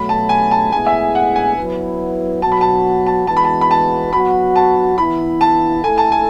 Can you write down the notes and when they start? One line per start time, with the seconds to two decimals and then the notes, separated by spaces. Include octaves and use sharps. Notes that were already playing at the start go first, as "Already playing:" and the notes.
Already playing: B2 F#3 A3 B5
0.09 A5
0.29 G#5
0.51 A5
0.72 A2 G#3 B3 E4 G#4 G#5
0.87 E5
1.15 F#5
1.36 G#5
1.57 F#3 B3 E4 B4
2.42 B2 F#3 B3 F#4 A5
2.52 B5
2.61 A5
3.06 A5
3.27 E3 G#3 B3 F#4 B4 A5
3.37 B5
3.45 A5
3.61 B5
3.71 A5
4.13 F#3 B3 F#4 B5
4.56 A5
4.98 E3 B3 E4 B5
5.41 A5
5.84 A3 E4 A4 G#5
5.98 A5
6.12 G#5